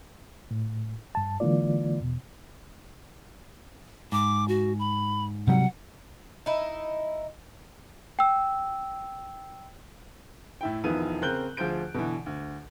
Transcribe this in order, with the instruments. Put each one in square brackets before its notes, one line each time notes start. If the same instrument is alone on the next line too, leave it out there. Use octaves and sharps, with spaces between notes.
[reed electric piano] A2
G2 A5
D3 E3 G#3 A#3 F4 D5
E2 B2
[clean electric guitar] G#2 [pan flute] D6
[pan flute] F#4
B5
[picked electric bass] C3 F#3 G3 [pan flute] F#5
[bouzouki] D#4 E4
[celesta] G5 E6
[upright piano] A2 E4 G5
E1 E2 D#3 F3 B3 D#7
C#3 C4 A#4 F#6 G6 G7
D2 F3 G#4 C5 G6 D7
B2 D3 E3
D2